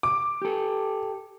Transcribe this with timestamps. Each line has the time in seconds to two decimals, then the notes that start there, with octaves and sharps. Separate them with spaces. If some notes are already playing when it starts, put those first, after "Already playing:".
0.03 D6
0.42 G4 A4